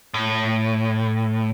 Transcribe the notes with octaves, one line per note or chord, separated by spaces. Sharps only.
A2